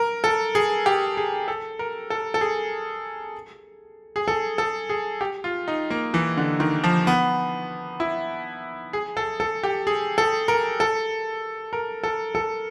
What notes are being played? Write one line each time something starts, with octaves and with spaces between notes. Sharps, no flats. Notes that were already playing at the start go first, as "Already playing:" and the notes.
Already playing: A#4
A4
G#4
G4
G#4
A4
A#4
A4
A4
G#4
G#4
A4
A4
G#4
G4
F4
D#4
A#3
E3
D3
D#3
F3
B3
E4
G#4
A4
A4
G4
G#4
A4
A#4
A4
A#4
A4
A4